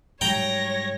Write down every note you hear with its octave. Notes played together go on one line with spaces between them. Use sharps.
G#2 F#3 G3 C#5 G5 A#5 A#6